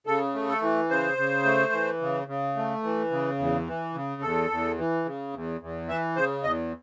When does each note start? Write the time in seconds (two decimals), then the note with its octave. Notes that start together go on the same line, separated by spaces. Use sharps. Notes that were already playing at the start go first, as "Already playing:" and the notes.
0.07 C#3 A4
0.34 A3
0.48 A4
0.62 E3
0.90 C#3 C5
1.18 C#3
1.45 A3
1.73 E3
2.01 C#3
2.28 C#3
2.56 A3
2.84 E3
3.11 C#3
3.39 E2
3.67 E3
3.94 C#3
4.22 E2 A4
4.50 E2
4.78 E3
5.05 C#3
5.34 E2
5.61 E2
5.89 E3 E5
6.16 C#3 C5
6.43 E2 D#5